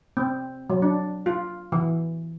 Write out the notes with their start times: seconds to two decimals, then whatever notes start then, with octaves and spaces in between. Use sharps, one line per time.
0.17 C4
0.70 F#3
0.82 D4
1.26 F4
1.72 E3